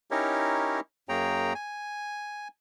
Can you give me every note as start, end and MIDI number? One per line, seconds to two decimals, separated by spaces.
0.11 0.80 61
0.11 0.80 63
0.11 0.80 64
0.11 0.80 67
0.11 0.80 70
0.11 0.80 73
1.09 1.53 42
1.09 1.53 58
1.09 1.53 68
1.09 1.53 73
1.09 1.53 79
1.09 1.53 82
1.55 2.48 80